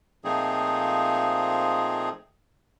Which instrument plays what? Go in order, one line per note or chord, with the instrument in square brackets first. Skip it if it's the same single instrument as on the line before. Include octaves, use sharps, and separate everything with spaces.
[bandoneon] A#2 F3 A3 C4 D#4 G#4